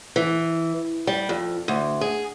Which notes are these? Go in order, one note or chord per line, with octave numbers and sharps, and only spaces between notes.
E3
G3
F2
D2
G#4